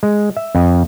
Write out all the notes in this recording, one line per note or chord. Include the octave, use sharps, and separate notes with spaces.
G#3
E5
F2